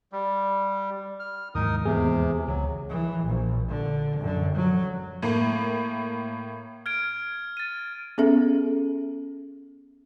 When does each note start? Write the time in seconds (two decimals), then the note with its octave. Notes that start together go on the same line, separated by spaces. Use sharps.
0.12 G3
1.20 F6
1.55 D#2 G#2 E3 D#4 A#4 D#6
1.86 E2 C3 G#4
2.48 C#2 F#3
2.90 E3
3.25 A#1
3.69 D3
4.20 F#2 D3
4.55 F#3
5.22 A2 A#3
6.86 F6 G#6 D7
7.57 A6 D#7
8.18 B3 C#4 G#4 A4 E5